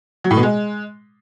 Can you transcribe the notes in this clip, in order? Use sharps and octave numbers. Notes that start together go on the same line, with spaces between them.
F#3
A2
B2
G#3